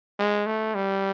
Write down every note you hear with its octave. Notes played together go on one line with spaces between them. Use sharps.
G#3
A3
G3